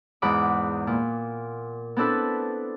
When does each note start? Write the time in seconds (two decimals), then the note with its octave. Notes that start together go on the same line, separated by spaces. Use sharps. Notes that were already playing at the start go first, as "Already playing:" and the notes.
0.22 E2 G#2 F#5 B5 D6
0.87 A#2
1.96 B3 C4 D4 E4 A4 B4